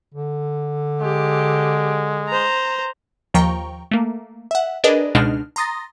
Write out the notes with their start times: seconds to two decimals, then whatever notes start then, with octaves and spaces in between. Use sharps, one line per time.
0.14 D3
1.01 G#3 G4
2.28 C5 A#5
3.34 D#2 F3 G5 A#5 C#6
3.91 A3 A#3
4.51 E5 F#5
4.84 D4 G#4 A#4 B4 D5 D#5
5.15 C#2 B2 G#3 D4 D#4 F6
5.56 A#5 C6 D#6 A6 A#6